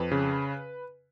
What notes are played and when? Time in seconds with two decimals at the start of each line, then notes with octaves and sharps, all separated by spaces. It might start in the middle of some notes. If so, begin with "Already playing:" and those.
Already playing: F2 B4
0.11 C#3